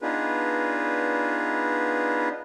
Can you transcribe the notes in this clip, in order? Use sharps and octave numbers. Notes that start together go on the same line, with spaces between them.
B3 D4 D#4 F4 G#4 B4